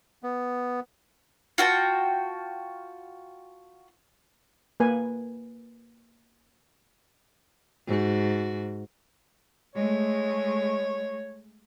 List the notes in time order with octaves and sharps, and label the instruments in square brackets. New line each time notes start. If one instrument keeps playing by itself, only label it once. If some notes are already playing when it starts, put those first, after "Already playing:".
[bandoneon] B3
[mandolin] F4 F#4 G5 A5
[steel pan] A#3 B4 G#5
[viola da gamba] G#2 F#4
[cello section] G#3 A3 [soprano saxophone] C#5